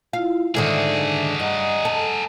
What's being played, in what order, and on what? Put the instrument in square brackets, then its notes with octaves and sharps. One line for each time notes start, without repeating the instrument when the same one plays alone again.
[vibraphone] E4 F4 [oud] F5
[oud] G#2 D3 D#3 [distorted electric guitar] F#4 G#4 [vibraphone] E5
[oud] G2 [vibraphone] D#5 F#5 A#5
[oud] A4